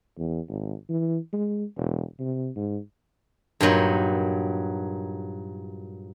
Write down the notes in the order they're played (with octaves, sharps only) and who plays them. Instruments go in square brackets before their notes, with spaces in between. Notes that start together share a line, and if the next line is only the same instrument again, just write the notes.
[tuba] E2
G#1
E3
G#3
E1
C3
G#2
[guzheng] G2 A#2 F#3 D#4